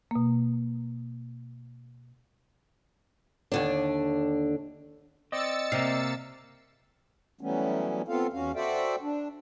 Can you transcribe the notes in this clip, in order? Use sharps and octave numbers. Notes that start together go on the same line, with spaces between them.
B2 A#3
D#2 D3 D4
C4 D5 D#5 E6 A6 C#7
C3 A#3 F5
E3 F#3 G3 A3 B3 C#4
B3 C4 F4 A4 F5
E2 C#4 F#4 F5
F#4 A4 C5 D5 E5 G5
D4